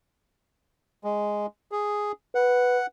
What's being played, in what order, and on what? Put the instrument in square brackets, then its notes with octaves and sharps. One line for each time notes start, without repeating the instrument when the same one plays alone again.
[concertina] G#3
G#4
[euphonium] B4 [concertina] F#5